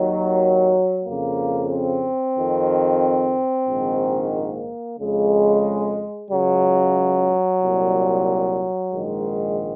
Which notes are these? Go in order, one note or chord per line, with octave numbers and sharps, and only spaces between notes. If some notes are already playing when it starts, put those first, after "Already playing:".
Already playing: D#2 D#3 F#3
F2 C#3 A#3
C4
F2 D#3
A#1 G#2 D#3
A#3
F2 C#3 G#3
C#2 C#3 F#3
C2 A#2
A#1 G#2 D#3 G#3